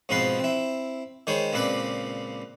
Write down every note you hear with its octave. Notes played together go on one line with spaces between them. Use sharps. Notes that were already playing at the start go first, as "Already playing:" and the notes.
G#2 B2 F3 C4 B4 C6
C4 E4
D#3 G#3 C5 C#5 B5
C#2 A#2 C4 B4 D5 B5